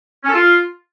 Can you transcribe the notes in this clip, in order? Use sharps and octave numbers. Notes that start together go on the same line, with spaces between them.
C#4
A4
F4